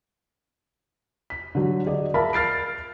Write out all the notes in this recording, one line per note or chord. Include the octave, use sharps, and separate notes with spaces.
B6
D3 F#3
G#4 D5 D#5
A#4 E5 F5 A5 B5
F6 A6 C7 D7